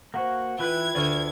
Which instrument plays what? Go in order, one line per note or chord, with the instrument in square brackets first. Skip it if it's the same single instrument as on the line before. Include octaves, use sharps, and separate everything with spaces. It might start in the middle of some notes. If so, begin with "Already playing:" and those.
[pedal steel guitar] A#3 F#4 [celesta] C5 F#5
[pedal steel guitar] E3 F#6 [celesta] F4 [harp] B4 G5 B5 [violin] G#6
[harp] D2 [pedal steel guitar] D5 F6